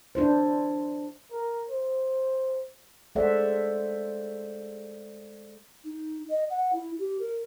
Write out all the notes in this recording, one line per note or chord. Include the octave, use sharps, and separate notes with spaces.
D4 E4 C5
A#4
C5
G#3 A4 C5 D5 E5 F#5
D#4
D#5
F#5
E4
G4
A#4